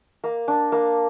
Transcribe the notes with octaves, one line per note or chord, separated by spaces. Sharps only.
A#3
D4
A#3